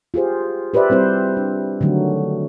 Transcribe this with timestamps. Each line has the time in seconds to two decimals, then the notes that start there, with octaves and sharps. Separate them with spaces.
0.14 F4 G4 G#4 C5
0.74 G4 B4 C5 D5 E5
0.90 G3 C4 E4 C5
1.37 D4
1.81 D3 D#3 F#3 A3